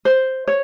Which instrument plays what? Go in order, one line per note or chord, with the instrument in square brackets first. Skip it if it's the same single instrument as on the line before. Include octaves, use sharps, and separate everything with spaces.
[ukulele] C5
C#5